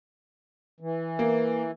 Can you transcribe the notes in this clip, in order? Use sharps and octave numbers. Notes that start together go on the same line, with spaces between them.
E3
A#3